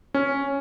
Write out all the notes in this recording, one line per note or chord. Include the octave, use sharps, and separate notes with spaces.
C#4